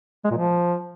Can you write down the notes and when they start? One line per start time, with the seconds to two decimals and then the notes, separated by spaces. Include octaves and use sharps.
0.25 G#3
0.31 A#2
0.37 F3